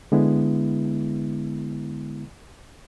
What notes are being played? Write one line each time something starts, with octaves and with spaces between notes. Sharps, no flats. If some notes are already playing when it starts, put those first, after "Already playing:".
D3 G#3 B3 E4